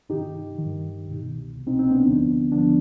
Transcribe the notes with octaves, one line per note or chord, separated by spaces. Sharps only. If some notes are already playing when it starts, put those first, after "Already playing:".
G2 D#3 D#4 G4
G2 D#3
C2 B2
C2 B2
C4 D#4
C4 D#4
B3 D4
D2 D3 F3
D2 D3 F3 B3 D4